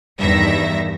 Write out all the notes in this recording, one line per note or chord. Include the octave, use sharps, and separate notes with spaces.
E2 G2 D#3 E5 A#6